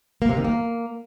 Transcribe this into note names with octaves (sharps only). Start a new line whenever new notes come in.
A#3
C3
D#3
A#3